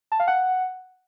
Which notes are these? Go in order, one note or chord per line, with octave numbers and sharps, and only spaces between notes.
A5
F5
F#5